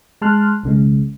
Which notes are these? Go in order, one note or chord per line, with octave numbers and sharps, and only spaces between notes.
G#3 A5 C6 F6 F#6
B1 C#3 G#3